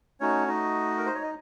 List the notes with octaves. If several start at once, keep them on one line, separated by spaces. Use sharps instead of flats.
A3 C#4 D#4 F#4 C#5
D#4 D#5
A#4
C5
C#5
D#5